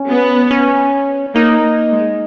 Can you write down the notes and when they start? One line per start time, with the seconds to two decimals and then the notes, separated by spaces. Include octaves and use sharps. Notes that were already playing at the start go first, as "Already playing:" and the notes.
Already playing: C#4
0.09 B3
0.51 C#4
1.35 A#3 D#4
1.91 G#3